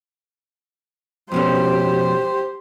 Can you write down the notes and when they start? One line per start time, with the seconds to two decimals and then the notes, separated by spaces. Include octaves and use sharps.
1.32 F2 B2 C#4 G4 C5